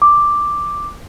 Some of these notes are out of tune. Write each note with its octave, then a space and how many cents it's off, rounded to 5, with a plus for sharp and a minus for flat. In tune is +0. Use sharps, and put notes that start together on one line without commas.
D6 +0